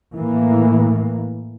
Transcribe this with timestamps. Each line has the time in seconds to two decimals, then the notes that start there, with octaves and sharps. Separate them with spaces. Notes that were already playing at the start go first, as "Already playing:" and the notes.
0.16 A2 E3 A#3